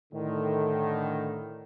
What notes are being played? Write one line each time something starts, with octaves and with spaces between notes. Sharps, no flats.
A2 D3 D#3